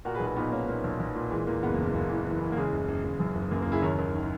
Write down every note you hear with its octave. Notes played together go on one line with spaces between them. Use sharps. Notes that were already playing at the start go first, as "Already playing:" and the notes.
A#2 F#4 A#4
G#4 B4
B1
G#4 B4
A#2 B3 D#4
A#2 A#3 C#4
A#2 A#3
B1
B1
A#2
E3 G#3
E2 A#3
F#1 G#3 B3
A#3
F#1
G#3
F#1 A#3
E3
E2
E3
A#3
C#3 G#3
F#1
F#1
F#1
F#2
F#1
F#2 A#3
A#3
F#1
E4 G#4
D#2 A#4 C#5
D#2
D#3